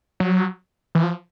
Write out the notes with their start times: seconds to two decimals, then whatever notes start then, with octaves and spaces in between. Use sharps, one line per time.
0.20 F#3
0.95 E3
1.03 F3